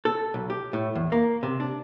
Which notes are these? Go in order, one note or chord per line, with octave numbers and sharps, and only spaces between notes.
A4
B1
G4
A2
E2
A#3
C3
D4